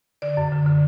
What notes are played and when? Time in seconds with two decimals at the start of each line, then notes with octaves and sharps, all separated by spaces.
0.22 D3 D5
0.37 F#2
0.52 D3
0.66 D3